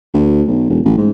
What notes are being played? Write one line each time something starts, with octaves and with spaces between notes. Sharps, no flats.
D2
B1
E1
A1
G#2